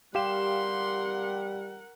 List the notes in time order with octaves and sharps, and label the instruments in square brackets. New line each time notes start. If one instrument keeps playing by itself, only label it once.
[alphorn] G3 [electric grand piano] G4 F5 E7 [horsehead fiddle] A#4 F#5 [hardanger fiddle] C6